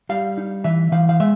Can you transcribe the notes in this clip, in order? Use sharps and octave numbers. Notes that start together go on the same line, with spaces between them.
G3 F5
D#4
E3 E5
E3 F5
F5
G#3 E5